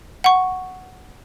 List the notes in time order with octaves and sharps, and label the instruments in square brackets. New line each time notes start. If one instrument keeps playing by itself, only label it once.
[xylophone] F#5 C#6